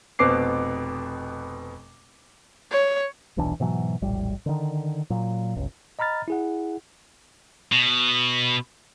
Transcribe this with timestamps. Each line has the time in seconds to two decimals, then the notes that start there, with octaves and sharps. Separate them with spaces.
0.19 F1 B2 B3 C4 D6 C7
2.71 C#5
3.37 D#1 B1 E3 D4
3.60 G#2 B2 E3 F#3
4.02 E1 A#1 A2 G3
4.46 D3 D#3
5.10 A#2 F#3
5.56 G1 C#2
5.99 D#5 A#5 B5 F6 A6
6.28 E4 G#4 F#5
7.72 B2